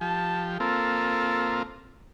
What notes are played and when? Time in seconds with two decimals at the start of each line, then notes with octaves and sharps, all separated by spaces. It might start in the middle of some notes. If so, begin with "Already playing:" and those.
0.01 F3 G4 A5
0.60 A#3 C4 F4 A4